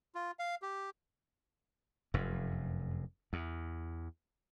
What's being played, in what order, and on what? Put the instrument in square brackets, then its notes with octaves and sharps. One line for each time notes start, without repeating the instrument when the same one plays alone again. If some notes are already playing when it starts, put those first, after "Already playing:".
[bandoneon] F4
F5
G4
[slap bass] F1 F#2
E2